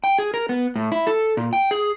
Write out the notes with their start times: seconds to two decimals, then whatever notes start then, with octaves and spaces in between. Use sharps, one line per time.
0.04 G5
0.18 G#4
0.34 A#4
0.49 B3
0.76 A2
0.92 E4
1.07 A4
1.37 A#2
1.53 G5
1.71 G#4